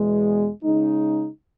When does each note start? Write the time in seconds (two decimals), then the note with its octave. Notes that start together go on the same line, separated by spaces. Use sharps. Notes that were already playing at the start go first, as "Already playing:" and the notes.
Already playing: E2 B2 G#3
0.64 C#3 G#3 D#4